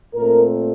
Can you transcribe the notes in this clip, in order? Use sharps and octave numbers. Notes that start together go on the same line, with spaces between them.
A#2 A3 C4 A#4